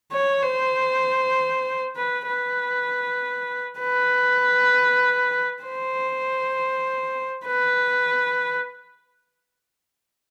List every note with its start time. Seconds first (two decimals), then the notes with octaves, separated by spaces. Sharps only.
0.12 C#5
0.43 C5
1.96 B4
2.27 B4
3.79 B4
5.63 C5
7.46 B4